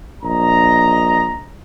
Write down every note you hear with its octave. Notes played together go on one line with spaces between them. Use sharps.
A#1 D#5 A#5